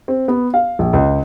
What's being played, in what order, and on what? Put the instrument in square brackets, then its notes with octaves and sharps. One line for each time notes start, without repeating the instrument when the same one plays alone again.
[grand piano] C4
B3
F5
A#1
C#2